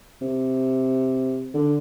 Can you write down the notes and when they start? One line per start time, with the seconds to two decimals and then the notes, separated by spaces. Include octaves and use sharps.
0.21 C3
1.54 D3